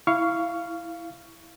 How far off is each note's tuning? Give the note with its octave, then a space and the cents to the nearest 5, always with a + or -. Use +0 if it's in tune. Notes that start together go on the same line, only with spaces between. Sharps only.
E4 +0 F5 -10 C#6 +15